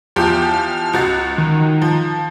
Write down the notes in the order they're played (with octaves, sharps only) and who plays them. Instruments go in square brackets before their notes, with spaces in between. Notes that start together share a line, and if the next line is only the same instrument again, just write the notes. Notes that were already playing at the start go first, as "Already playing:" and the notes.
[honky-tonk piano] E2 F3 G4 [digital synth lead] F6
[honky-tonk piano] C#2 F#4 A6
[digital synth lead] D#3
[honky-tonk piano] F3